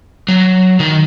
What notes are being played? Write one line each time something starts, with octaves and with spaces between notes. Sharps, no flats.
F#3
D#3